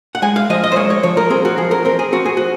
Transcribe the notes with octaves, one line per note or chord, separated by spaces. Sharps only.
F#5
G#3 G#5
F5
F3 D#5
D#5
C5
G#3 C#5
C#5
F3 C#5
A#4
C4 G#4
F#4
F3 G#4
A#4
C4 A#4
G#4
C4 F#4
G#4
F3 F#4